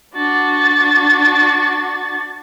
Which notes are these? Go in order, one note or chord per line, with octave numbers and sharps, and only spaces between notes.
D4 F#4 A6